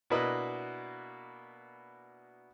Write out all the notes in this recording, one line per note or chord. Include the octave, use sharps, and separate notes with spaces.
B2 A#3 D4 E4 B4 D#5